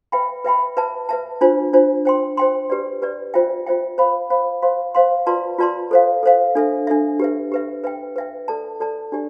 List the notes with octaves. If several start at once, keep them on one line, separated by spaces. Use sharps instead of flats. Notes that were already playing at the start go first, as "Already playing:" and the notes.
B4 E5 G5 B5
B4 E5 G5 B5
B4 E5 A5
B4 E5 A5
D4 F4 C5
D4 F4 C5
C5 G5 C6
C5 G5 C6
G4 B4 D5
G4 B4 D5
F4 C5 E5 G5
F4 C5 E5 G5
C5 F5 B5
C5 F5 B5
C5 F5 C6
C5 F5 C6
F4 B4 D5 A5 C6
F4 B4 D5 A5 C6
A4 C5 F5
A4 C5 F5
D4 A4 E5
D4 A4 E5
G4 B4 E5
G4 B4 E5
B4 E5 G5
B4 E5 G5
A4 D5 A5
A4 D5 A5
D4 G4 D5